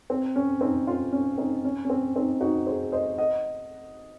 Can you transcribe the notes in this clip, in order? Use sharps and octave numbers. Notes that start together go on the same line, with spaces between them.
C4
C#4
C4 D#4
C#4 F4
C#4
C4 D#4
C#4
C#4
C4
C4 D#4
D#4 F#4
G#4 C5
C5 D#5
D#5 F#5